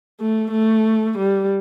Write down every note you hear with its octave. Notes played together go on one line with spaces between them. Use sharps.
A3
A3
G3